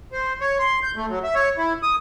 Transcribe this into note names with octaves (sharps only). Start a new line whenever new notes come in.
C5
C#5
C6
G6
A3
F#3
E5
C#5
E4
D#6